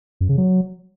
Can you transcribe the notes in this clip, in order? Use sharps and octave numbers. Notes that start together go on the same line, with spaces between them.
F#2
C#3
F#3